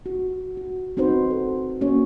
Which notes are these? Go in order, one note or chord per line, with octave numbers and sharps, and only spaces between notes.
F#4
F#4
C4 D#4 F#4 B4 C5
A4
A#3 C#4 F#4 C#5